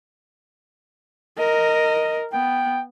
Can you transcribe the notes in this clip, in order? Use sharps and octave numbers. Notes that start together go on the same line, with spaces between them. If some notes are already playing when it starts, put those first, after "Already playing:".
A#4 D#5
B3 G5